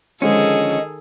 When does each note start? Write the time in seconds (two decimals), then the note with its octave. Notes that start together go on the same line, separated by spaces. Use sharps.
0.22 D3 D#3 F3 G#3 C#4 G#4 A4 D#5